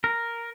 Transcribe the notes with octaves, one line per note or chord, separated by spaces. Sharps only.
A#4